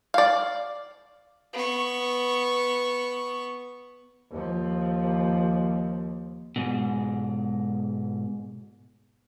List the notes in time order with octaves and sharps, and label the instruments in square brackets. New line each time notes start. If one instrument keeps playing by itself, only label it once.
[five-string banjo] D5 F5
[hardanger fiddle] B3 C#6
[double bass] D#2 F3
[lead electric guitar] G#2 B2